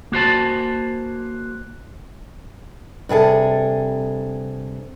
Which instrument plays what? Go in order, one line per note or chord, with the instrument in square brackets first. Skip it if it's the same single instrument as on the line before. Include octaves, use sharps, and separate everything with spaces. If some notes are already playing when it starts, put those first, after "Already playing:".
[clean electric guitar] A#3 F#4 C5 A5
[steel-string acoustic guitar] G2 C3 G#4 A4